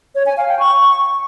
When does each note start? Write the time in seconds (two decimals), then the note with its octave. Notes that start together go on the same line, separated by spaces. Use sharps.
0.15 C#5
0.26 G#5
0.37 F5
0.48 G5
0.59 C#6